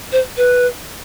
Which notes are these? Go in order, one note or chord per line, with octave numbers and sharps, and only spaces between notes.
C5
B4